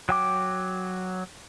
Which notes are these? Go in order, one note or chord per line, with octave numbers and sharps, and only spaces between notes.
F#3 G5 D6